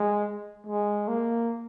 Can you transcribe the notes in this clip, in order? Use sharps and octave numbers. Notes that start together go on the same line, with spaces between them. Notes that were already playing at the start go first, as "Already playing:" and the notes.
Already playing: G#3
G#3
A#3